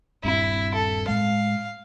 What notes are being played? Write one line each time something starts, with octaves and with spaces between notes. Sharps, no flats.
D#1 G2 C4 E4
A4
A2 G#3 F5